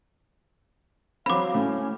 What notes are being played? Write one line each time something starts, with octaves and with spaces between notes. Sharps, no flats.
F#3 C4 F5 B5 D6
A2 C#4